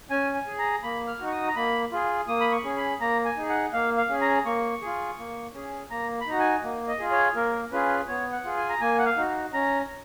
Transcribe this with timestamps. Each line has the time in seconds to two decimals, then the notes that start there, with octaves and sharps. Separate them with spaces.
0.10 C#4 G#5
0.35 G#5
0.47 G#4
0.59 A#5
0.83 A#3 B5
1.07 F6
1.19 D#4 F#4
1.27 C#6
1.32 D#6
1.48 A#5
1.56 A#3 B5
1.92 F4 G#4
2.28 A#3 D#6
2.41 B5
2.52 C#6
2.65 C#4 G#4
2.77 B5
3.01 A#3 A#5
3.25 G#5
3.37 D#4 G#4
3.49 F#5
3.73 A#3 F5
3.97 F5
4.09 C#4 G#4
4.21 A#5
4.46 A#3 C#6
4.82 F4 G#4
5.18 A#3
5.54 C#4 G#4
5.90 A#3 A#5
6.21 B5
6.27 D#4 F#4 A#5
6.39 G#5
6.63 A#3
6.88 D#5
6.99 F4 G#4
7.11 C#5
7.35 A#3 A#4
7.72 C#4 F4 G#4 B4
8.08 B3 C#5
8.33 F#5
8.44 F4 G#4
8.57 G#5
8.69 A#5
8.81 A#3 G#5
8.99 F#5
9.05 F5
9.17 D#4 F#4
9.53 C#4 A#5